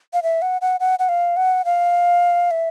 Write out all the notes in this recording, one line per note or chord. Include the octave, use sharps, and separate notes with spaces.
F5
E5
F#5
F#5
F#5
F#5
F5
F#5
F5
E5